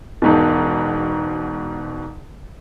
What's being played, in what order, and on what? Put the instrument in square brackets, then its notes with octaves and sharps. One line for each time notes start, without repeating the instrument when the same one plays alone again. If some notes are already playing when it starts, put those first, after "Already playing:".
[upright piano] E1 G#2 B2